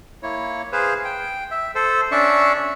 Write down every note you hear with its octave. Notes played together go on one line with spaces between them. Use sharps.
A#3 E4 C#5
G#4 B4 C5 F5
G5
E5
A4 C5
C#4 D4 D5 E5 C#6